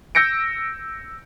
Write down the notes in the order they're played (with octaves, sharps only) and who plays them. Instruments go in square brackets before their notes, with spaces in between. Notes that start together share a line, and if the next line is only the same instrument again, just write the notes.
[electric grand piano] E6 G6 A#6 C#7 D7